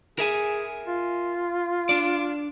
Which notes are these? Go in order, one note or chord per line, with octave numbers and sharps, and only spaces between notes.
G#4 A#4 E5 G#5
F4
D4 D5